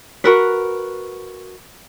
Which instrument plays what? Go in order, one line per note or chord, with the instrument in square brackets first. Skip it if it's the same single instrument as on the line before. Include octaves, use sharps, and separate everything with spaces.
[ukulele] F#4 A#4 B4